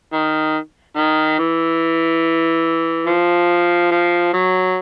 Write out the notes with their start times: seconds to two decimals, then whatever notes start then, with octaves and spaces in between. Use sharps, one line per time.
0.13 D#3
0.97 D#3
1.39 E3
3.06 F3
3.91 F3
4.33 F#3